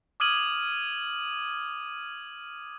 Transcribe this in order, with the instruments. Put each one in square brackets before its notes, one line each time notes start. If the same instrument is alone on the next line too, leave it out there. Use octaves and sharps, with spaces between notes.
[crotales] D6 D#6 F6 G#6 D#7 F#7